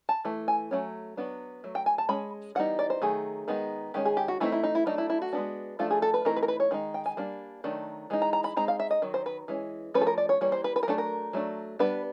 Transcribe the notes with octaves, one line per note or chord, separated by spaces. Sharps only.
A5
E3 A3
G#5
F#3 A3 C#4
F#3 B3 D4
F#3 A3
G5
G#5
A5
G#3 C#4 B5
E3 G3 B3 D#4 F#5
D5
C5
D#3 F#3 A3 G#4
D#3 G#3 B3 D#4
D#3 G#3 C#4 G4
G#4
G4
F#4
E3 A3 C4 D#4 E4
E4
D#4
E4
F#3 A3 D4 D#4
E4
E4
F#4
G#3 B3 D4
F3 A3 D4 F4
G#4
A4
B4
E3 A3 C4 D#4 A#4
B4
A#4
B4
C#5
D#3 G#3 D#4
G5
G#5
G3 A#3 D4
D#3 F#3 A3 D4
E3 G#3 D#4
A#5
A#5
B5
G#3 C4 D#4 A#5
F5
E5
D#5
D#3 F#3
C5
B4
E3 G#3 C#4
F3 A3 C#4 B4
A4
A#4
D5
C#5
E3 G3 A#3 C#5
C5
B4
B4
A#4
F#3 A3 D4 A4
A#4
F#3 A3 D4
G3 B3 D4 B4